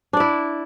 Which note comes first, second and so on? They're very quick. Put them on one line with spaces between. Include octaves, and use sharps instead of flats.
D4 D5 E4